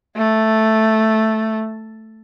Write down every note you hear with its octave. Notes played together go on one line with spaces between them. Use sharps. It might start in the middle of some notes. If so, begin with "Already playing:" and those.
A3